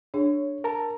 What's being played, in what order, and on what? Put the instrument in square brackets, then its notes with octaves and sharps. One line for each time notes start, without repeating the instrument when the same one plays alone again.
[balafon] D4 G#4 [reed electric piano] C#5
[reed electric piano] A#4 A5 A#5